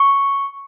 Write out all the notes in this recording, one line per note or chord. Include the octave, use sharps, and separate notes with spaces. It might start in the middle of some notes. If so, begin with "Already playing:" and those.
Already playing: C#6